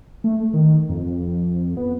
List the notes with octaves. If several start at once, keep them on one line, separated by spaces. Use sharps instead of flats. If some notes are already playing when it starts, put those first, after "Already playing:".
A3
D#3
F2
B3